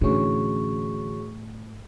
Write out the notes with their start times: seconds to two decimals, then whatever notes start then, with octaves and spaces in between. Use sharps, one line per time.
0.01 A2 D3 E3 C#4 F#4 G#4 C#6